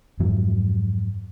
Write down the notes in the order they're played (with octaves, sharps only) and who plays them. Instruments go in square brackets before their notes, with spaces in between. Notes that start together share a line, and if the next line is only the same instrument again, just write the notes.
[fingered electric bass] F2 G#2 E3 F#3